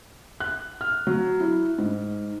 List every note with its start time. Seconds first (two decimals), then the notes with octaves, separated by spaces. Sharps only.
0.40 F#6
0.81 F6
1.07 F#3
1.40 E4
1.78 G#2